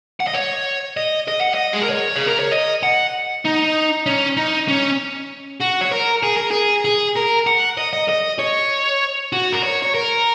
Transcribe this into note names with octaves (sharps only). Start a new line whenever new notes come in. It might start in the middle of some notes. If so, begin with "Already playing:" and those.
F#5
D#5
C#5
D#5
D#5
F#5
D#5
G#4
A#4
C#5
G#4
A#4
C#5
D#5
F#5
D#4
C#4
D#4
C#4
F#4
C#5
A#4
G#4
A#4
G#4
G#4
A#4
F#5
D#5
D#5
D#5
C#5
F#4
A#4
C#5
C#5
A#4